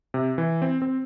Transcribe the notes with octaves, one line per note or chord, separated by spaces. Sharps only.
C3
E3
C4
C4